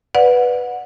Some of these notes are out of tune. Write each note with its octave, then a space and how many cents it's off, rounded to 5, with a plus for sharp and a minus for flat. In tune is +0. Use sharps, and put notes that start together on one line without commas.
B4 +0 D5 +0 F#5 -20